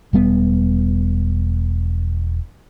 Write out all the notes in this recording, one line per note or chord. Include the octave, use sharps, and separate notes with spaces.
E1 G3 B3